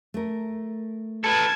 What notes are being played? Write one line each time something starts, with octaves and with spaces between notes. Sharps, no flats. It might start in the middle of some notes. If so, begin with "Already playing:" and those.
A3 A#4
A4 B4 A5 G#6